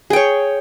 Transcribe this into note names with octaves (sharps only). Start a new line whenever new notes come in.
G#4 C#5 G5